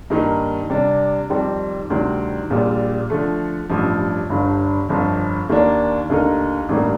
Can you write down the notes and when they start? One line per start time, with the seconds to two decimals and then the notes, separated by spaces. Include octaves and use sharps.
0.10 G2 D#3 A#3 D#4
0.70 C3 G3 D4
1.30 F2 D#3 G3 C4 G4
1.90 D2 C3 D#3 G3 C4
2.50 A#1 A#2 G3
3.10 D3 F3 A3
3.69 A1 G2 F3
4.29 G1 G2 D3
4.89 G1 F2 D3 F3
5.49 D#2 D#3 A#3 D4
6.10 D#2 D3 A3 D#4 A#4
6.69 A1 G2 D#3 G3 A#3